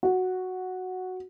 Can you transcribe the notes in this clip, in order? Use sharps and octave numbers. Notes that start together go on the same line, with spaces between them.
F#4